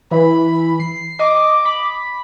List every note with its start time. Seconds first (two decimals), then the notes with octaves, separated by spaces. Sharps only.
0.11 E3 B5
0.80 C7
1.19 D#5 D6
1.65 B5